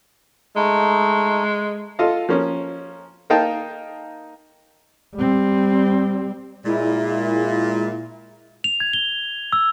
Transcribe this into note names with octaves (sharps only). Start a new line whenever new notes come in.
G#3 A3 D#4
F4 A4 D#5 F5
F3 A#3 C#4
A#3 D#4 F5 G5 A5
G3 C4
A#2 G#3 E4
F7
G#6
G7
E6